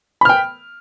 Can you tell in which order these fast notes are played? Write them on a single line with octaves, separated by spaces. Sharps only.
B5 F6 G5